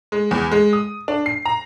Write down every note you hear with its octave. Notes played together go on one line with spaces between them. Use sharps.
G#3
E2
G#3
D#6
D4
C7
A#5